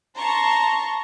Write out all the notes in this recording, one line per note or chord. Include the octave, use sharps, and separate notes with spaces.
A5 A#5 C6 C#6